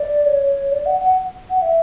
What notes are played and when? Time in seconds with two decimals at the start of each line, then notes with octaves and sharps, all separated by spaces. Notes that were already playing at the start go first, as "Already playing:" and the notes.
Already playing: D5
0.26 C#5
0.71 D5
0.86 F#5
1.01 F#5
1.50 F#5
1.62 E5